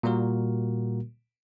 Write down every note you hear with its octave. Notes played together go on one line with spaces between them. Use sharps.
A#2 G3 A#3 F#4 A#4